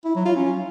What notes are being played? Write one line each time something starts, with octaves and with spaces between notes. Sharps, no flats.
E4
F#3
F4
C#4